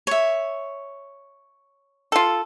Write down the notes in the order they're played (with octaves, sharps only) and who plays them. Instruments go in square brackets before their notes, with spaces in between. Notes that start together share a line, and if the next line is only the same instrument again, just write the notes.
[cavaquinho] C#5 E5
[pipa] F4 A4